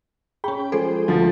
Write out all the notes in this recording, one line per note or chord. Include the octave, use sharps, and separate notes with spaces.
C#4 G#4 G5 B5
F3 G#3 G#4 A4 C5
D2 F3 A6